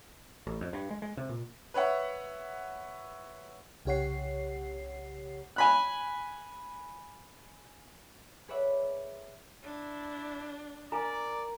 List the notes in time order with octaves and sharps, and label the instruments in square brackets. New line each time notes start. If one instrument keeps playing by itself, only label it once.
[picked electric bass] A1
F2
G2
G#3
G#3
C3
A#2
[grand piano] B4 C#5 E5 F#5
[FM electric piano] C2 C#3 G4 C#5 F#5 C7
[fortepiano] G#5 B5 F#6
[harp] G#4 B4 C#5 D5 E5 F#5
[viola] D4 [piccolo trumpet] E4
[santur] A#4 [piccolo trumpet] D5 [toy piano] F5 G#5 A#5